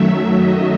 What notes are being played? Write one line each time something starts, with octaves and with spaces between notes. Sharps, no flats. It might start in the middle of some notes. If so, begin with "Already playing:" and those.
Already playing: F#2 D#3 F#3 A3 E5
D#5